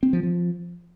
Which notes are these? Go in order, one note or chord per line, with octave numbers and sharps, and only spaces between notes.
C4
F3
F3